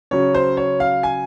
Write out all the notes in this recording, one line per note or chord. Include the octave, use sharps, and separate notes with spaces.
C#3 F#3 C#5
C5
C#5
F5
G#5